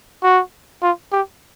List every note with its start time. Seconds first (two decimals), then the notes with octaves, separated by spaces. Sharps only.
0.23 F#4
0.82 F4
1.12 G4